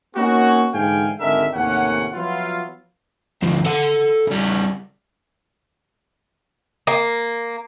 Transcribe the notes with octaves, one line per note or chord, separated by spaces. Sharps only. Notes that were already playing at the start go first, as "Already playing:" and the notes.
A#3 B3 C#4 D#4 F#4
G#2 D3 E3 F5 G5 G#5
G#1 D3 G#3 A#4 E5
D#2 A2 C3 A#3 C#4 F#5
F3 F#3 B3 E4 F4
D2 F3
A4 F#5
C#3 G3
A#3